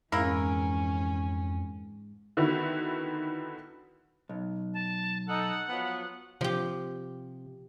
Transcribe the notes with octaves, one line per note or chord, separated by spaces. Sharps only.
F2 G#2 E3 A#3 C#4 E4 A#4
D3 D#3 B3 E4 F#4
B1
A5
D#4 A4 F#5
F3 F#3 B3
C3 F3 G4